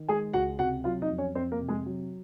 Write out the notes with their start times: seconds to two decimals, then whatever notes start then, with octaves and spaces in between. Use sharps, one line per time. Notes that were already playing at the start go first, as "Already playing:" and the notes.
Already playing: D#3
0.09 G#3 G#4 G#5
0.33 C#2 F#4 F#5
0.59 C3 F#4 F#5
0.84 F#3 F4 F5
1.02 D#4 D#5
1.10 F2
1.18 C#4 C#5
1.35 F2 C4 C5
1.52 A#3 A#4
1.60 C3
1.69 G#3 G#4
1.86 F#3